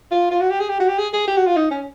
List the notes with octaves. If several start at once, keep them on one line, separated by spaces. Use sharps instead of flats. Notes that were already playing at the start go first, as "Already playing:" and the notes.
F4
F4
F#4
G4
G#4
G4
F#4
G4
G#4
G#4
G4
F#4
F4
D#4
C#4